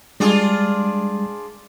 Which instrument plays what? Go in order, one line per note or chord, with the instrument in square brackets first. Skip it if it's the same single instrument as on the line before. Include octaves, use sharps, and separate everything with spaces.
[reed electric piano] G3 G#3 [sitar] D4 F4 G#4